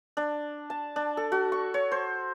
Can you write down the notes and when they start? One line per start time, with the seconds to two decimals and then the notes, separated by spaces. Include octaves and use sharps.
0.17 D4
0.70 A5
0.96 D4
1.17 A4
1.32 F#4
1.52 C#6
1.74 C#5
1.92 C5